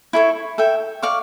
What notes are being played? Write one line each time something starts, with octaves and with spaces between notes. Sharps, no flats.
E4 A4 C#5
A4 E5 G5
D5 F5 C#6